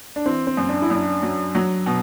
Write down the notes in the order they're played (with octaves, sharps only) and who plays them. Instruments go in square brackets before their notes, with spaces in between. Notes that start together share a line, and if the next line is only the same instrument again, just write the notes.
[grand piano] D4
[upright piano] E3 [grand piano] C4
[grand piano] C4
[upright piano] F#2
[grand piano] D4
E4
[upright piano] F#2 [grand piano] D4
[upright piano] F#3
F#3
B2